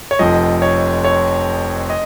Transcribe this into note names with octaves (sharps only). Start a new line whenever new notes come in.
C#5
F1 F2 F3 D#5
C#5
C#5
D#5